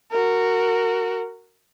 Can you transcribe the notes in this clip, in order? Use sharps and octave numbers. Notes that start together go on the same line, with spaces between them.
F#4 A#4